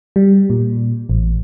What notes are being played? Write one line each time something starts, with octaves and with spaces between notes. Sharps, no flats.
G3
A#2
A1